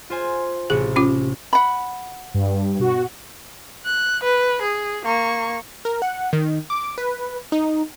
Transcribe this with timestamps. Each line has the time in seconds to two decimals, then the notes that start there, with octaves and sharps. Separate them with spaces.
0.10 F4 C5 G#5
0.70 A1 C3 G#4 C#7
0.96 C#4 F4 D6
1.53 F#5 B5
2.34 G2
2.80 B2 F#4
3.85 F#6
4.24 B4
4.62 G#4
5.05 A#3 C#6
5.85 A#4
6.02 F#5
6.33 D#3
6.70 D6
6.98 B4
7.52 D#4